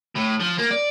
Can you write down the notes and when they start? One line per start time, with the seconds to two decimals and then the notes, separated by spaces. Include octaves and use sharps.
0.15 A2
0.40 F3
0.58 A#3
0.71 D5